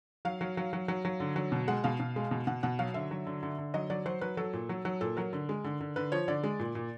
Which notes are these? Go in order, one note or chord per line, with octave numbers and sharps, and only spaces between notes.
F#3 F5
F#3
F#3
F#3
F#3
F#3
D3
F#3
B2
G#3 F#5
B2 F5
B2
G#3
B2
B2 F#5
B2 F#5
F#3 F5
D3 E5
F#3
D3
D3
D3
F#3 D#5
F#3 D5
F#3 C5
F#3 B4
F#3 A4
A#2
F#3
F#3
A#2 A4
F#3 A#4
D3
G#3
D3
D3
D3 B4
F3 C#5
D3 D5
G#3
A#2
A#2